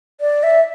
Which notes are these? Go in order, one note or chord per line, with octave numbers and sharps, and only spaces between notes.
D5
E5